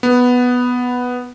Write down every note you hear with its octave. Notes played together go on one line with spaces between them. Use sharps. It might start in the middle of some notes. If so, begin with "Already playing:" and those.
B3